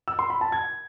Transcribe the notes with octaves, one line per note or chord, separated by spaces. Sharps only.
E6
C6
B5
A5
G#6